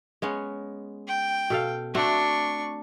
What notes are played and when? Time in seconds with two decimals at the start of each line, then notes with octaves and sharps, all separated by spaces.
0.22 G#3 B3 C#4
1.07 G5
1.50 B2 A4 F5
1.95 A3 C4 D4 F#4 C#6